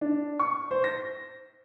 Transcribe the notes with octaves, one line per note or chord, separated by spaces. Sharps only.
D4
C#6
C5
A#6